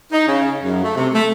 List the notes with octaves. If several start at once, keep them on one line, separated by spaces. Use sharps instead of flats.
D#4
C#3
F#2
A3
C3
A3